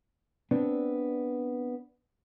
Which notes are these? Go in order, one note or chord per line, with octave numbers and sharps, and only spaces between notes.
B3 C4 D4